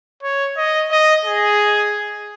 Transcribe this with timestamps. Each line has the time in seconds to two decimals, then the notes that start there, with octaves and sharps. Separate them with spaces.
0.23 C#5
0.57 D#5
0.91 D#5
1.25 G#4